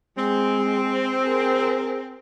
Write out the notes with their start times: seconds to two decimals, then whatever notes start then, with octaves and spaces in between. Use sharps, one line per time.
0.18 G#3 C4
1.20 G#4 A#4